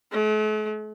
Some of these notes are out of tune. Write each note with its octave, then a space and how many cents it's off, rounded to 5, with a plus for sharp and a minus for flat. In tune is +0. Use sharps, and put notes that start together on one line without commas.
A3 -45